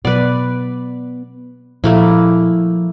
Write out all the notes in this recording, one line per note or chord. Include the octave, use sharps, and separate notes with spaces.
B2 F#3 B3 B4 D5
A#2 F3 A3 A#3 E4